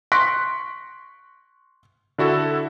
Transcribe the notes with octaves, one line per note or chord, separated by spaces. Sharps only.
C6 C#6 F#6 A#6 B6 D7
D3 E4 F#4 A4